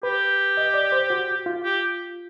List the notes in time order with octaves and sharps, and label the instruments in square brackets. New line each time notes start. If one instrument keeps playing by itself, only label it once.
[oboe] G4 [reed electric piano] B4
[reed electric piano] D#5
D5
C5
F#4
F4
[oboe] G4